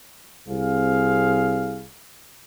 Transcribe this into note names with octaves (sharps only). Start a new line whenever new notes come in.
C2 C4 G#4 F5